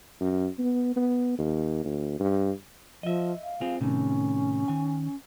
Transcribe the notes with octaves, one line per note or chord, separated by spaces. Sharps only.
F#2
B3
B3
D#2
D2
G2
F3 D#5 E5
F5
C4 F4 G#4
A2 C3 D#3 C#4
D#3 G#5